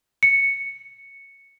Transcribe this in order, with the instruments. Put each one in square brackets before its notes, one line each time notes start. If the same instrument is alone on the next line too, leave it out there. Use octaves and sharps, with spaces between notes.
[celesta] C#7